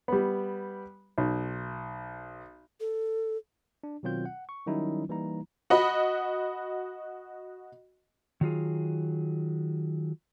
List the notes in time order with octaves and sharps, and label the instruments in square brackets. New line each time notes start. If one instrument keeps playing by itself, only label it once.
[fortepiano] G3 B3
B1
[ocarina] A4
[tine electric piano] D4
B2 D#3 F#3 C4 F4 G6
F#5
C#6
D#3 F#3 G3 C#4 D#4 E4
E3 G3 A#3 D#4 E4 A#5
[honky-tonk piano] F#4 D#5 B5
[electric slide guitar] D#3 F#3 F4 G#4